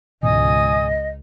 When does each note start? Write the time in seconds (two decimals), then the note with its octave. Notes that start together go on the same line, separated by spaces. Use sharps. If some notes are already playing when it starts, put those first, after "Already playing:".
0.23 C#2 G#2 B2 E3 D#5 G#5 D#6